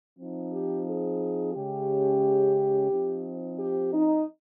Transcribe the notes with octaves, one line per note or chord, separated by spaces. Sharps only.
F3 C4 D#4
G4
G#4
C#3 G#3 C#4 G4
F3 C4 D#4
G4
D#4